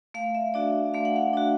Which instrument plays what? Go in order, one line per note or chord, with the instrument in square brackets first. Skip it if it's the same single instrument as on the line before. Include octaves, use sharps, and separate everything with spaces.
[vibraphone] A3 F5
E5
D4 F#4 D5
A3 F5
F#5
F5
D4 F#4